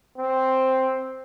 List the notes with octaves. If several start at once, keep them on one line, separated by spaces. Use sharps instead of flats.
C4